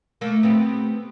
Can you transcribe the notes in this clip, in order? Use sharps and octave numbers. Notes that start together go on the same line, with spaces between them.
A3 A#3
B3 C4 G4